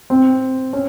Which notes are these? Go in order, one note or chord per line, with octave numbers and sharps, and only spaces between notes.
C4
C#4